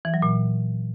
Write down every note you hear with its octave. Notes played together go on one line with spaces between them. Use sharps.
E3
F#3
A#2